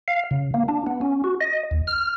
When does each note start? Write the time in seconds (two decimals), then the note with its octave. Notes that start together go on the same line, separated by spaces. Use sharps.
0.08 F5
0.31 C#3
0.54 A#3
0.68 D4
0.87 B3
1.01 C#4
1.24 F#4
1.41 D#5
1.71 D#2
1.87 F6